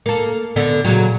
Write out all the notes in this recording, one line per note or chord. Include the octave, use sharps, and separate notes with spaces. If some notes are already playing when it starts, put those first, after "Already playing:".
A#3 A4
D3 B3
A#2 C#3 F#3